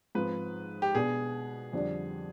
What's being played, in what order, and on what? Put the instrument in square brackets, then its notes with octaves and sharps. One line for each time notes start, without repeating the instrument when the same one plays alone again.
[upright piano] G#2 F3 C4 [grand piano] B4
[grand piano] G4
[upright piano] B2 B3 D4 [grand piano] G#4
[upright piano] F2 D3 G3 D4